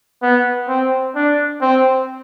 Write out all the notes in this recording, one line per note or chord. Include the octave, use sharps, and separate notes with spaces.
B3
C4
D4
C4